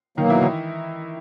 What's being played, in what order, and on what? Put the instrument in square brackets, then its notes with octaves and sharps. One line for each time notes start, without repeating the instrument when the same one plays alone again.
[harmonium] B2 F#3 A#3 [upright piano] D#3 D#4
[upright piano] E3 E4
D#3 D#4